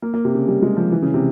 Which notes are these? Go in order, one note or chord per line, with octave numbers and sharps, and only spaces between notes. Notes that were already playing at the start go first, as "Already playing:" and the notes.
A#3
A#3
C3
C#3
G3
G#3
F3
E3
C#3
C3